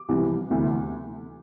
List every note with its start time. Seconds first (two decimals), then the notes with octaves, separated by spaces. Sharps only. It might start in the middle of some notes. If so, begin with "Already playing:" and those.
Already playing: D6
0.09 C2 C3 E3
0.50 D2 C3 E3